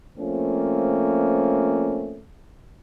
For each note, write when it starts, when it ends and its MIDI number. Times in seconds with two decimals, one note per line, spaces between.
0.17 2.21 53
0.17 2.21 57
0.17 2.21 58
0.17 2.21 60
0.17 2.21 61